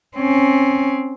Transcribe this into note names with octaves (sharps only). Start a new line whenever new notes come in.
C4 C#4